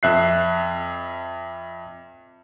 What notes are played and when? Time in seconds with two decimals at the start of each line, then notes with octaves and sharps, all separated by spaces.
0.03 F2 E5 F#6 C7